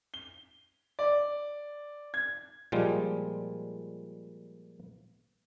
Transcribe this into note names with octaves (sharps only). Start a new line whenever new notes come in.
G7
D5
G#6
A#2 F3 G3 G#3